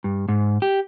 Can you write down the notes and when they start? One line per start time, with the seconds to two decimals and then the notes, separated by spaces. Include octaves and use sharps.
0.04 G2
0.28 G#2
0.62 G4